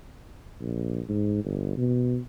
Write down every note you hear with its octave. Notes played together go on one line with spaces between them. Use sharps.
A#1
G#2
G1
B2